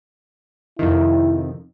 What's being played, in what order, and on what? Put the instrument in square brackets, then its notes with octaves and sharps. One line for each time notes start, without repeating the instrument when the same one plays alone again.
[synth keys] F2 C3 D#3 [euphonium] E4